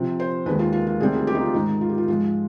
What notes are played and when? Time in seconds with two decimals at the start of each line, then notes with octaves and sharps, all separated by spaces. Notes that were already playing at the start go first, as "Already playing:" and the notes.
Already playing: C3 F3 C4
0.20 C5
0.46 D#2 D#3 G#3 B4
0.59 F4
0.73 F4
0.87 F4
1.00 D2 C3 D#3 G3 C4 G#4
1.13 G#4
1.27 G4
1.35 D#4
1.41 F4
1.54 G#2 D#3 G#3 D#4
1.81 F4
1.89 G4
1.98 F4
2.08 G#2 F3 G#3 F4